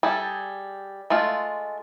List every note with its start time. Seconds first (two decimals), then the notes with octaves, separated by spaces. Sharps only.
0.03 G3 G#4 A4
1.10 G#3 A3 F4